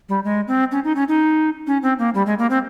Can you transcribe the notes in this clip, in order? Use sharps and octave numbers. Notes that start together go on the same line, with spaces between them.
G3
G#3
C4
C#4
D#4
C#4
D#4
C#4
C4
A#3
G3
G#3
A#3
C4